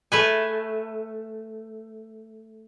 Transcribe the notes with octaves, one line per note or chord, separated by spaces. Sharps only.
A3 B4 G#5